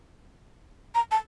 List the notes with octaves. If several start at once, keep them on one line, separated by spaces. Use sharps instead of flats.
A#5
A5